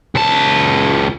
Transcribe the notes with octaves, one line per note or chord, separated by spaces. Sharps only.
C#2 A5